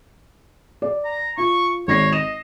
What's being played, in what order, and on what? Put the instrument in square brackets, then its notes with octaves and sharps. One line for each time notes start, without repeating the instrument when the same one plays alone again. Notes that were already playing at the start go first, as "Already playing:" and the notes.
[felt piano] D5
[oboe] A#5
[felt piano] F4 [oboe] C#6
[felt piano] G#1 A#6 C7 [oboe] C#5
[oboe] D#5 [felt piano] E7